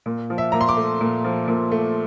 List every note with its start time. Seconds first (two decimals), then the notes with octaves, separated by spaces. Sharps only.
0.06 A#2
0.30 F3
0.38 E5
0.52 A#2 A#5
0.61 C6
0.69 D6
0.77 A3
1.01 A#2
1.24 F3
1.48 A#2
1.72 A3